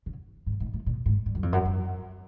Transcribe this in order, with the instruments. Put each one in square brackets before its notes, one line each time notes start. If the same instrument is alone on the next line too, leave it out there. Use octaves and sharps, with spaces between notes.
[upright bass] C#3
G#2
G#2
A2
A#2
G#2
G2
F#2
F2
F#2
F#2